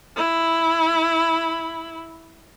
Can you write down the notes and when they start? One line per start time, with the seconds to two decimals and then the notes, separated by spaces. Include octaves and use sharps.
0.17 E4 B5